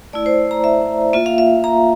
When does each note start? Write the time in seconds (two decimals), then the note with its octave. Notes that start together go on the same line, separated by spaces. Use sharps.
0.13 A3 E4 D5
0.26 C5
0.51 A#5
0.64 E5
1.13 A#3 F4 E5
1.26 F5
1.38 E5
1.64 A#5